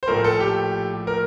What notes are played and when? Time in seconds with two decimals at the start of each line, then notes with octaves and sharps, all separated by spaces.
0.03 C5
0.08 A#1 A2 F3 A3 A#4
0.24 A4
0.40 G4
1.07 A#4